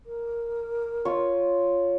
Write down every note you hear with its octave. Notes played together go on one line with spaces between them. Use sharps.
A#4
F4 C#5